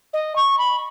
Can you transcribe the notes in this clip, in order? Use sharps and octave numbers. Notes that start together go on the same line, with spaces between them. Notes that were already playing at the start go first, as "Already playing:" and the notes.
D#5
C#6
B5